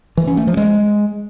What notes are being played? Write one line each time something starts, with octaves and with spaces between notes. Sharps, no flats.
E3
C#4
A3
F3
G#3